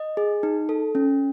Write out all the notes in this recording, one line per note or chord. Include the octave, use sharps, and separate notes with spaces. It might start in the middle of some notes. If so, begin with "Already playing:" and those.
Already playing: D#5
G#4
D#4
A4
C#4